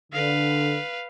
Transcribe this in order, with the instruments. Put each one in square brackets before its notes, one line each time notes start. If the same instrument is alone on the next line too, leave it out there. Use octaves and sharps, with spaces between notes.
[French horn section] D3 [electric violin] B4 F5